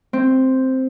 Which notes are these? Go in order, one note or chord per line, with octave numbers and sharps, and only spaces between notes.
C4